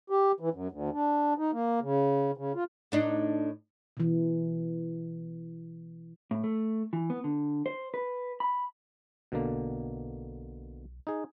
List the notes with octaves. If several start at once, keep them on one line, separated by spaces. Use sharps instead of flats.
G4
E3
F#2
D2
D4
D#4
A#3
C#3
C#3
F4
A2 D4 D#4
B2 E3
A2
A3
E3
B3
D3
C5
B4
B5
B1 B2 D3 A#3
D#4 G#4